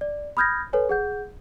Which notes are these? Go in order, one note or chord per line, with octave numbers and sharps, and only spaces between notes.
D5
B5 D#6 F6 G6 G#6 A#6
A4 B4 C#5 G#5
G#4 F#5 G6